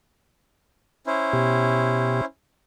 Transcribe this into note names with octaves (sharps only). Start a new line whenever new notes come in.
C#4 E4 C5
B2 G4